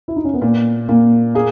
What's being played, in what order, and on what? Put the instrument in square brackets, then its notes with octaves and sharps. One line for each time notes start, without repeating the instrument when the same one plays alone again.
[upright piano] E4
D#4
C#4
B3
[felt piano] A#2 [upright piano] A#3
[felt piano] A#2 [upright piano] A#3
[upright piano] A#3 [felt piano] G#4